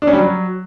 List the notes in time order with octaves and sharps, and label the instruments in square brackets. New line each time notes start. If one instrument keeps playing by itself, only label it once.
[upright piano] D4
C#4
G3
F#3